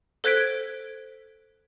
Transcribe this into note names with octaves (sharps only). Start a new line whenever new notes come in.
A4 C5 F#6 G#6 B6 D7